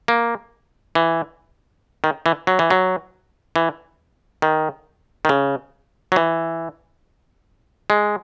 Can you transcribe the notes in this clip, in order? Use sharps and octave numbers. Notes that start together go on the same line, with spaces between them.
A#3
E3
D#3
E3
F#3
E3
F#3
E3
D#3
D#3
C#3
F#3
E3
G#3